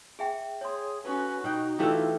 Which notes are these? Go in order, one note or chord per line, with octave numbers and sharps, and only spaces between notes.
G#4 E5 G5
G#4 C#5 C6
C#4 F#4 A4 B4
B2 D#4 G5
E3 A3 E4 F4 G4 G5 E6